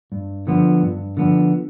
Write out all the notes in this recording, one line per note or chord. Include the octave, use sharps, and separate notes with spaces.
G2
D3 F3 B3
G2
D3 F3 B3